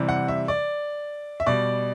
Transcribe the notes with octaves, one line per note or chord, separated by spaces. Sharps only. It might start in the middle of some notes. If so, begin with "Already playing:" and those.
Already playing: C3 E3 G3
F#5
E5
D5
E5
B2 G3 D5